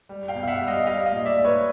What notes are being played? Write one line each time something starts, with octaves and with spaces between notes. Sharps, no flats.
G3
F5 G5
B2
F5
E5 F#5
G3
D#5 F5
G3 D#5 F5
D#5 F5
A#2
D5 E5
A#2
B4 C#5